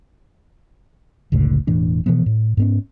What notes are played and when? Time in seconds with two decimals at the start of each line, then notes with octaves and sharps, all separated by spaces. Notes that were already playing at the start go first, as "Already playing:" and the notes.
1.32 F#1 C#2 A2 D3
1.67 E1 A2 E3 D4
2.06 B2 E3 F3 B3
2.26 A2
2.57 G#2 B3 C#4